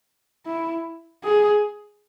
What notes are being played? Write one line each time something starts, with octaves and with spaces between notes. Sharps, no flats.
E4
G#4